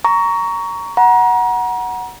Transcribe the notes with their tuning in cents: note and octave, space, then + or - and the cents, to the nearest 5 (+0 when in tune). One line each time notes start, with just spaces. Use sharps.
A#5 +0 C#6 +20
F#5 +0 A#5 +35